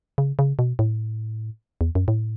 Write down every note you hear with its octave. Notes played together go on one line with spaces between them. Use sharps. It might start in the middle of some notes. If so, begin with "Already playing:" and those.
C#3
C#3
B2
A2
E2
F#2
A2